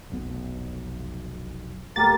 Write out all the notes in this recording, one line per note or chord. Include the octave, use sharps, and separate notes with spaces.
F1 B1 B3
D1 A3 A#3 G4 A#4 A6